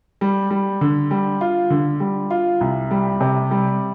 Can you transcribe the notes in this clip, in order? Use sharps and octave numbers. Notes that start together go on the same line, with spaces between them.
G3
G3
D3
G3
F4
D3
G3
F4
C2
G3
C3
G3